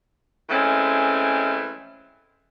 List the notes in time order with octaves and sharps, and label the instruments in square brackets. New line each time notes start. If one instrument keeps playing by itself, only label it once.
[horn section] E3 G#3 A3 C4 C#4